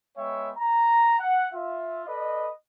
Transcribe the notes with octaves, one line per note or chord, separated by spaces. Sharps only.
G#3 B3 C#5 E5 G5 C#6
A#5
F#5
F4 E5
A4 B4 D5 D#5